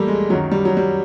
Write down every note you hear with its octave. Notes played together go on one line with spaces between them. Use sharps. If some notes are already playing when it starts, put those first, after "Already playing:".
Already playing: A2 E3 G3 A3 A#3
G#3
F#2 D#3 F#3
G3
F#3
G3